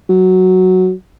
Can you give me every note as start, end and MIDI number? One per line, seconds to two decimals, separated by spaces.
0.10 0.92 54